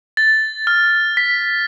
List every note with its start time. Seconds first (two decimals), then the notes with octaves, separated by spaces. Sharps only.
0.17 A6
0.67 F6
1.17 B6